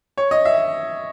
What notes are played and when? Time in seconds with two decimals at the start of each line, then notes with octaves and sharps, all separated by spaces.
0.18 C#5
0.31 D#5
0.45 E5